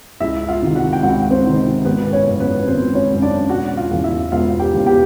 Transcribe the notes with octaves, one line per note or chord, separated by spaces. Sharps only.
C#2 E4 E5
F4 F5
C3 D#3
F#4 F#5
G5
C#2 F#4 F#5
C4 C5
C3 D#3
G#1 B3 B4
C#4 C#5
F#2 C#3
B3 B4
G#1 C4 C5
C#4 C#5
F#2 C#3
D4 D5
E1 F#4 F#5
F4 F5
E2 C#3 E3
E4 E5
E1 F4 F5
G4 G5
E2 C#3 E3
G4 G5